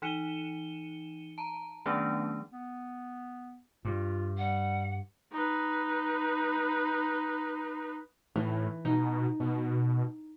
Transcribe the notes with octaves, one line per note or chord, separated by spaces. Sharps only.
E3 D#4 C#7 D#7 E7 G7
A5 A#5
D#3 F#3 A3 B3 C#4 D4
B3
G2 F4
G3 F#5
D#4 B4
A2 E3
B2 D#4
B2